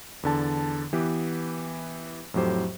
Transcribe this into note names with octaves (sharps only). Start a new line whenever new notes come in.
E2 D3 A5
E3 B3 G4 B4
F2 A2 F#3 G4 C5